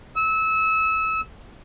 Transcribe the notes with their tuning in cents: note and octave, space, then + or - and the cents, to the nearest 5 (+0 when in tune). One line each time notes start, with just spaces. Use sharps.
E6 -25